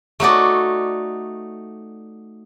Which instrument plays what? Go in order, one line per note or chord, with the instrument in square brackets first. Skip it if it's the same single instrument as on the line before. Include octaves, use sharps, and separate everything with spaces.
[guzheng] A3 D#4 F#4 D5